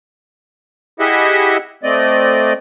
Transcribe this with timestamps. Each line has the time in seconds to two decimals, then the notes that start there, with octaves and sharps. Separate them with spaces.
1.00 E4 G4 G#4 D#5 E5 F#5
1.83 A3 C4 D5 D#5